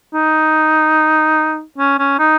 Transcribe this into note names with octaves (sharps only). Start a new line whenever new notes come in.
D#4
C#4
C#4
D#4